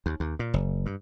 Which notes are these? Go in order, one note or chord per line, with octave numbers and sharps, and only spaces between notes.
D#2
D#2
A#2
F#1
G2